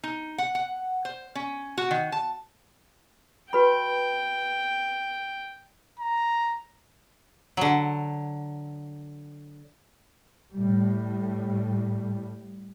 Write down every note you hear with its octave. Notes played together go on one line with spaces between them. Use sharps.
D#4
F#5
F#5
C5
C#4
F#4
D#3
A5
F#4 B4 G5 B5
A#5
D3 F#3
A2 G3